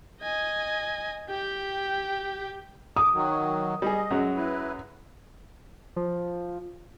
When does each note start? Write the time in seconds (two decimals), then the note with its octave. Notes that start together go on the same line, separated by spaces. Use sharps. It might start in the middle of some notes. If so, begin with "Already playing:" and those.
0.22 D#5 G#5
1.30 G4 G5
2.96 D6 D#6
3.14 D#3 F#3
3.82 G3 G#4 D#5
4.10 F#2 F#3 G#3
4.36 E4 B4
5.96 F3